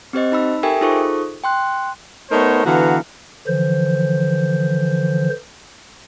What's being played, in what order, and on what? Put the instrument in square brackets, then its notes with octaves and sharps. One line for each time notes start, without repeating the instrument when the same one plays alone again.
[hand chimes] C4 G4 C5 D#5
D#4 B5 E6
G4 A4 A#4 E5 G5 G#5
D#4 F4 G#4 A4 C5 C#6
G5 C6 F#6
[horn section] A3 B3 D#4 A#4 C5 C#5
D3 E3 B3 F#4 F5 A#5
[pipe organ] D3 E3 F3 C5